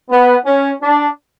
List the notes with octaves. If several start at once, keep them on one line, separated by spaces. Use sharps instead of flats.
B3
C#4
D4